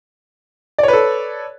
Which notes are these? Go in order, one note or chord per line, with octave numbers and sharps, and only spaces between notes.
A4 B4 C#5 D5